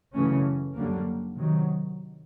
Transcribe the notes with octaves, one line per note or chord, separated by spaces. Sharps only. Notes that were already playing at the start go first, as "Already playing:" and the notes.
F#2 C#3 E3 A3 C#4
F#2 D3 G3 A#3
C3 D#3 F#3